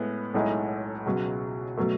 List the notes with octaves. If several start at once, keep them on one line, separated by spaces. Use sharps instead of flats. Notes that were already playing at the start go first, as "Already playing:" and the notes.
Already playing: A2 G#3 B3
B1 A2 G#3 D#4
C#2 B2 F#3
B2 F#3 A3